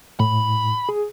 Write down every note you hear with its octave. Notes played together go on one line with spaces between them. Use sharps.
A2 B5
G#4